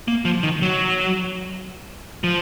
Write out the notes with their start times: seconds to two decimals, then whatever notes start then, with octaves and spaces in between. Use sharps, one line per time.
0.08 A#3
0.25 F3
0.43 D#3
0.62 F#3
2.24 F3